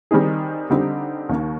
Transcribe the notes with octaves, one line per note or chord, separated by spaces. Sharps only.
D#3 G3 C4 D#4 G#4
D3 G3 C4 D#4 G4
D#2 D#3 A#3